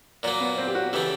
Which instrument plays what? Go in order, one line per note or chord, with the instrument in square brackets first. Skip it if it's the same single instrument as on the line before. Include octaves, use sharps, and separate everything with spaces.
[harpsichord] A#2 F#3 A#3
[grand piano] B3
C4
G4
F#4
[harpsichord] C#3 E3 A3 [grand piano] G4